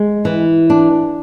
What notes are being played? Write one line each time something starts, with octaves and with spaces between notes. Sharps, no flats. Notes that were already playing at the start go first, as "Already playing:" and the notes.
Already playing: G#3
E3
D4